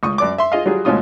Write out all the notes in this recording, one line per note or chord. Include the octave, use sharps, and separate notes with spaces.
C#2 C#6 D#6
F#2 D5 D6
E5 C6
F4 G#4 D#5 F5
F#3 G3 F4 G#4
D2 G#2 B2 C#4 F4 D#6